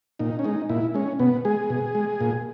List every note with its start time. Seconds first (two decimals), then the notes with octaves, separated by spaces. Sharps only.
0.19 A#2 D#4
0.39 C#4
0.44 G#3 D#4
0.69 A#2 E4
0.94 G#3 C#4
1.19 B2 B3
1.45 G#3 G#4
1.70 B2
1.95 G#3
2.21 A#2